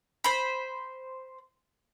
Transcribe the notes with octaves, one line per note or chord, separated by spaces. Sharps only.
C5 B5